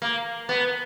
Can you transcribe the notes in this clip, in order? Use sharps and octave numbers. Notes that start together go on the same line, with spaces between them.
A#3
B3